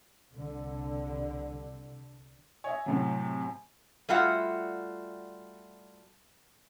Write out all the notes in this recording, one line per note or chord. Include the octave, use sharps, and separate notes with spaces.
C2 D3
C#5 D#5 E5 G#5
A2 C3 F#3
G3 A3 F4 F#4 E5 F#5